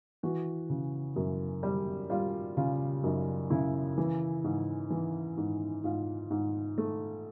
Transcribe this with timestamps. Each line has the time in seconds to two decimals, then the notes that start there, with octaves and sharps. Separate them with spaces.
0.23 E3 F#4
0.70 C#3
1.16 F#2
1.63 G3
2.10 G3 F4
2.57 C#3 F4
3.04 F#2 D#4
3.50 C#3 E4
3.98 E3
4.44 G#2
4.90 E3
5.37 G#2
5.84 G#2 F4
6.30 G#2
6.78 A3